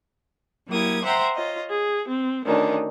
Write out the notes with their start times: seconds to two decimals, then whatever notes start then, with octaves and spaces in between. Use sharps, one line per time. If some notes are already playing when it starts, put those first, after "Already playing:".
0.68 F#3 A#3 E4 G4 D#6 G#6
1.02 C5 E5 F#5 G5 A#5 C6
1.35 F4 C#5 D#5
1.70 G#4
2.08 C4
2.45 D2 D#3 C#4 D4